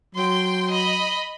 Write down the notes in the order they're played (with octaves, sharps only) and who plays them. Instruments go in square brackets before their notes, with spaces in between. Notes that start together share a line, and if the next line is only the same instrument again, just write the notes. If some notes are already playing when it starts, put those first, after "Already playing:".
[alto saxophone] F#3 [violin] G5 C6
[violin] D#5 B5